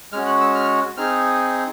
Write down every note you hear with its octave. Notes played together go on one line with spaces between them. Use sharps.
G#3 C#4 F#4 F6
F#6
E6
F6
C4 D#4 G#4 F6